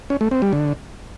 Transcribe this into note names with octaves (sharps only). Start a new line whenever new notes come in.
C#4
A3
C4
G3
D3